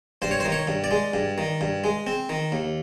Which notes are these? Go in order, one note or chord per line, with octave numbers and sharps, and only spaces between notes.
G2 C5
C#5
C5
D#3
C#5
G2
D5
G#3
G2
D#3
G2
G#3
C4
D#3
D#2